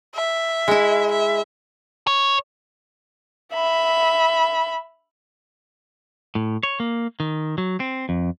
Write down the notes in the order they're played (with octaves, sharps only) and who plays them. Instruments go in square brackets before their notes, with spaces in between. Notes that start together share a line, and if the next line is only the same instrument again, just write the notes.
[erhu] E5
[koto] G#3 E4
[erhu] E5
[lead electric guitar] C#5
[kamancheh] E5 B5
[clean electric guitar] A2
C#5
A#3
D#3
F#3
C4
F2